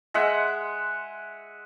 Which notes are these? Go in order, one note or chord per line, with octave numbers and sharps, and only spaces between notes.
G#3 E5 F#5